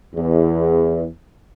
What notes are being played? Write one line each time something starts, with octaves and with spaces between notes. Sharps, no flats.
E2